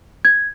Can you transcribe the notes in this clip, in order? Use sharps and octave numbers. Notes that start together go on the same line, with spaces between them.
G#6